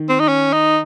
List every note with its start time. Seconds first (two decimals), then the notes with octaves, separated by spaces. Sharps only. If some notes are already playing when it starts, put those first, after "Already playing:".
Already playing: D#3
0.09 C4
0.20 D#4
0.28 C#4
0.53 D#4